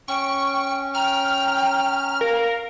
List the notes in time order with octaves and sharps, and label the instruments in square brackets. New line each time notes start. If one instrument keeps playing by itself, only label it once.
[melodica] C#4 [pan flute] G5 [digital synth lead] C#6
[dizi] G5 [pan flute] A#5 [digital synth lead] F6
[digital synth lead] A#4 [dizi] F5